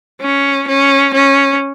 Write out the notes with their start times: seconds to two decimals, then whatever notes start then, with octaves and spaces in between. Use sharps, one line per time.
0.22 C#4
0.68 C#4
1.14 C#4